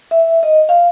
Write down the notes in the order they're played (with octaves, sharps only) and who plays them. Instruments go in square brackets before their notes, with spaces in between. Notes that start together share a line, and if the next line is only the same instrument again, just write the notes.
[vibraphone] E5
D#5
F5